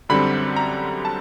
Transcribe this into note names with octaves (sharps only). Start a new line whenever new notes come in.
F#2 D3 G3 C4 B5
A#5
A5